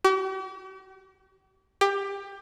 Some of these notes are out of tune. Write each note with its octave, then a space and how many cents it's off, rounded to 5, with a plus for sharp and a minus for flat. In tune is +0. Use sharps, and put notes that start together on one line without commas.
G4 -45
G4 +20